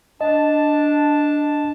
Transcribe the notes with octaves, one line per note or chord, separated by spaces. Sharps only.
D4 D#5 A5